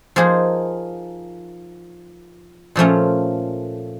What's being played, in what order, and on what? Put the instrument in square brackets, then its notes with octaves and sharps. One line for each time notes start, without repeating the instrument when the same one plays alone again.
[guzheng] F3 A#3 D#4 G#4
A#2 F3 A3 C#4